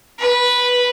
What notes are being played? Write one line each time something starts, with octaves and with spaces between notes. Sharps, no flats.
B4